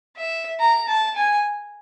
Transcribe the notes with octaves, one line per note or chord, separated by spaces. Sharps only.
E5
A#5
A5
G#5